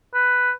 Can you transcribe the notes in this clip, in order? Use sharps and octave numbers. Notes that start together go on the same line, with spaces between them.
B4